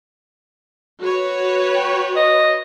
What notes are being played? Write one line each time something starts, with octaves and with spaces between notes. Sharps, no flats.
F#4 B4 C#5
G5
D#5